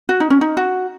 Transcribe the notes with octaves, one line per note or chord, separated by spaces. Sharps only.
F#4
D#4
C#4
D#4
F#4